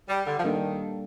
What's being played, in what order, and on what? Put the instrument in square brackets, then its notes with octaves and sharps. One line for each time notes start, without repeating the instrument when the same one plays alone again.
[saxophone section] G3
D3
F3
[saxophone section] D#3 [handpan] G3 A#3 D4 A4